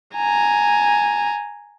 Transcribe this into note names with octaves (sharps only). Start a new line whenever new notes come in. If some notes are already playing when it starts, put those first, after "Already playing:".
G#5 A#5